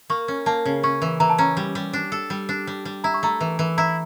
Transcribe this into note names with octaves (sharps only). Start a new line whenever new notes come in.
A#3 C#6
C#4
A#3 A5
C#3
C#4 C#6
E3
E3 A#5
A5
C#4 A#5
G3
G3
D4
A4
G3
D4
G3
G3
E4 A#5
C#6
A3 A#5
E3
E3
E4 A#5